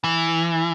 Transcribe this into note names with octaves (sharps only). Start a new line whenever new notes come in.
E3